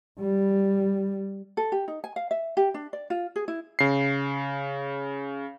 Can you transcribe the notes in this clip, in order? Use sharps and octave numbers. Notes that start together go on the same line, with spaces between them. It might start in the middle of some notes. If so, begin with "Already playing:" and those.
G3
A4
G4
D#4
G#5
F5
E5
G4
D4
D5
F4
G#4
E4
C#3 C7